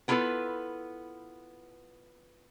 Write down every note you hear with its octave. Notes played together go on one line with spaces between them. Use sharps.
B3 E4 F4 G#4 A4 B4